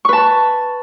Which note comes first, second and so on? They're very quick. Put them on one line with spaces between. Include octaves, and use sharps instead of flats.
C#6 B4 A5